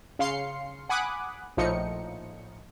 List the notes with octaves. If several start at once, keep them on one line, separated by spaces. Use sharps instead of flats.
C#3 F5 C6 C7 C#7
F#5 G#5 B5 D6 D#6 F#6
A#1 A2 F3 D#4 C#7